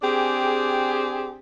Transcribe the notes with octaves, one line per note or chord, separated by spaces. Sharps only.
C4 D4 G4 G#4